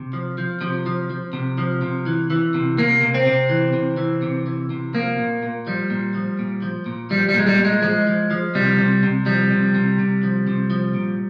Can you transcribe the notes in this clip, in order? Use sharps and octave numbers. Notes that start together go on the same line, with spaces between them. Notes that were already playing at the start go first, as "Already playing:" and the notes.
Already playing: C3
F3
F3
C3 F3
F3
F3
C3
F3
C3
E3
E3
C3
C3 A#3
C3
C4
C3
E3
C3
E3
C3
E3
C3
F3 A#3
A#2
A#2
F3 G3
A#2
F3
A#2
F3
A#2
F3 G3
G3
A#2 G#3
G3
A#2
G#3
F3 G#3
F3
F3
C3 G3
C3
C3
F3 G3
C3
C3
C3
F3
C3
F3
A#2